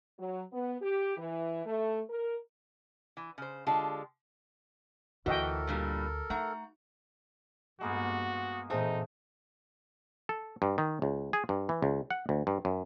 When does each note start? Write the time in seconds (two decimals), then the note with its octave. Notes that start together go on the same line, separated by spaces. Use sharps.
0.19 F#3
0.53 B3
0.82 G4
1.18 E3
1.66 A3
2.10 A#4
3.17 E3
3.38 C#3 C5
3.67 D3 G#3 F4 G4 A5
5.26 D2 E3 F4 F#4 A4 A#4 D#5 G5
5.67 G2 A#2 G3
6.30 A3 D#4 F#5 A#5
7.81 G2 G#3 A#3 B3 F#4
8.70 A#2 E3 G#3 A3 C4 D#4
10.29 A4
10.62 G2
10.78 D#3
11.02 C#2
11.33 G#4
11.49 G2
11.69 E3
11.82 C#2
12.10 F#5
12.29 D2
12.47 G2
12.65 F#2